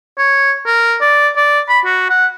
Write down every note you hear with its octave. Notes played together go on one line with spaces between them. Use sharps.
C#5
A#4
D5
D5
B5
F#4
F#5